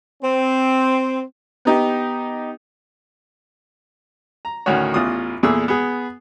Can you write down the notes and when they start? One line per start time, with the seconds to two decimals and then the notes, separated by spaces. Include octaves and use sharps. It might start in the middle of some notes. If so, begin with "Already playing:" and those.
0.23 C4
1.65 B3 D#4 G4
4.45 A#5
4.66 D2 A2 D#3 C#4 F#4 C#5
4.94 A1 E2 F4 D#6
5.43 E2 A#2 A3 G#4 E6
5.68 B3 G#4